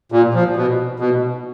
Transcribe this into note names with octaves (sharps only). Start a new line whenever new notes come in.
A#2
F3
B2
B2